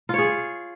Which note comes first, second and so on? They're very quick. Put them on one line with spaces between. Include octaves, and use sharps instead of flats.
F4 C#5 G#4